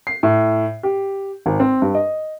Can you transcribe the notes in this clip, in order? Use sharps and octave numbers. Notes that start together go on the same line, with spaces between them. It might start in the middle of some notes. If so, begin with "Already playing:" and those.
C7
A2
G4
G#1
C4
G2
D#5